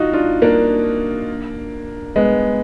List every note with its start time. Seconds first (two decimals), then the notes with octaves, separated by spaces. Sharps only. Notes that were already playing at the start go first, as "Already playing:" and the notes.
Already playing: D#4 F4 F#4
0.13 D4 F4
0.42 A#3 D4
2.16 G#3 B3